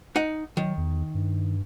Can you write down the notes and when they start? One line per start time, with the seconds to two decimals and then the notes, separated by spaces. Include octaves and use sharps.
0.16 D#4 F#5
0.57 D#3 F#3
0.78 E2
1.15 G2